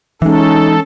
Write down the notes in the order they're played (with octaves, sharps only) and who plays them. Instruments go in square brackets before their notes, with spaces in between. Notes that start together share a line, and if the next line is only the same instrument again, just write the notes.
[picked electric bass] E3 G#3 [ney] C#4 [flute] D#4 [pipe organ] A4